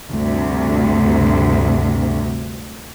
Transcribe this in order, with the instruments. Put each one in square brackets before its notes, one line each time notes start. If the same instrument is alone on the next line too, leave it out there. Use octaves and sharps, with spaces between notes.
[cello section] D2 G2 C3